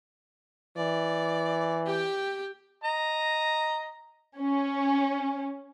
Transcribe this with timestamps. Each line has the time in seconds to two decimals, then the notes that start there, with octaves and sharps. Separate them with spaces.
0.77 E3 D5
1.86 G4 G5
2.84 D#5 A#5
4.39 C#4